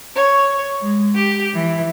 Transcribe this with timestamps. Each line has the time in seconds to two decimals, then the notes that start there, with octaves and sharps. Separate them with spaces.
0.15 C#5
0.81 G#3
1.15 G4
1.54 E3